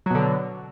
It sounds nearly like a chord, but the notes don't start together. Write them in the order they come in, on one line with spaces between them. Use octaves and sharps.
F#3 B2 D3